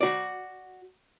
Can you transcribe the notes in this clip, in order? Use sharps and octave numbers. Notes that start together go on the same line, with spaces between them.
F#4 D5